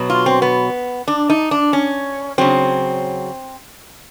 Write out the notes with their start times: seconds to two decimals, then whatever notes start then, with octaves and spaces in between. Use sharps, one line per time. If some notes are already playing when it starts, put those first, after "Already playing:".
Already playing: B2 F#3
0.10 F4
0.26 C4
0.42 B3
1.08 D4
1.30 D#4
1.51 D4
1.73 C#4
2.38 C#3 F#3 C4